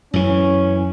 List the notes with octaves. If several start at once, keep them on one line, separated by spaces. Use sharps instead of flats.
F#2 E3 C#4